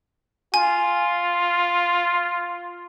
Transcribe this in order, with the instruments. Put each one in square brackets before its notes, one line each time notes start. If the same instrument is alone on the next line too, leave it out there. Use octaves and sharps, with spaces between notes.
[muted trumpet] F4 [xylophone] G#5